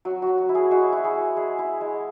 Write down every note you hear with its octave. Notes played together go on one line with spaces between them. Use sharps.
F#3 F#4
F#3 F#4
F#4
E4
G#4
G#3 F#4
E4
G#4
G#3
G#3 G#4
E4
G#3